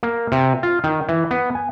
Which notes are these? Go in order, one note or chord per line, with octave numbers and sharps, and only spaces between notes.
A#3
C3
F4
D#3
E3
B3
G#5